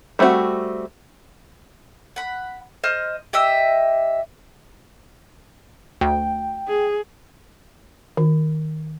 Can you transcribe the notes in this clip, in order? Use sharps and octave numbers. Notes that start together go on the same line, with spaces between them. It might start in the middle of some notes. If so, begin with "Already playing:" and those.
G3 A3 C4 D4 F#4
F#5 B5
C5 D#5 F6
G4 D#5 E5 E6
D2 G5
G#4
D#3